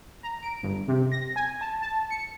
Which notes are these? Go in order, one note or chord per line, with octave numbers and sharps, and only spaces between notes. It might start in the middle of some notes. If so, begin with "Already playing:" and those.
A#5
D7
G1
C3
A#6
G#5
A5
A5
C#7